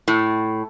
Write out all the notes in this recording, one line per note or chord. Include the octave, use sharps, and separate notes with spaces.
A2